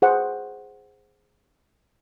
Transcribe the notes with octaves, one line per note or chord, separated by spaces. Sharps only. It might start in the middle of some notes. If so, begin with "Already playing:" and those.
G#4 C5 F#5